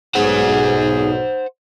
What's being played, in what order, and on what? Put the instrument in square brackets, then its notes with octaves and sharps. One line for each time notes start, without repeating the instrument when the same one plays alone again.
[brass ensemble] B1 G#2 [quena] G#4 [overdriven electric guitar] C5 F#5